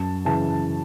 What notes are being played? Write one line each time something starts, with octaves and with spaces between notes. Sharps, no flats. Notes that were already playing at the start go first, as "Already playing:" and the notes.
Already playing: F#2 A5
C#3 E3 A5